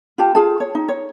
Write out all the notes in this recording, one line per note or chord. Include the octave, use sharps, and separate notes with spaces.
F4 G4 A5
F4 G#4 A5
C#5
D#4
C#5